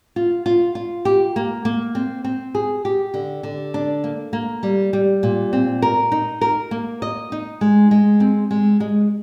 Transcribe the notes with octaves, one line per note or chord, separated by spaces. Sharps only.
F4
F4
F4
G4
A#3
A#3
C4
C4
G#4
G4
D3
D3
D4
A#3
A#3
G3
G3
A#2
C4
A#4
D#4
A#4
A#3
D#5
D#4
G#3
G#3
C4
G#3
G#3